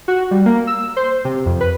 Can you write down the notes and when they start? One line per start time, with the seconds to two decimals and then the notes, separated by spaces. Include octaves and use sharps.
0.08 F#4
0.31 G3
0.46 A#3
0.67 E6
0.97 C5
1.25 C3
1.46 F2
1.61 B4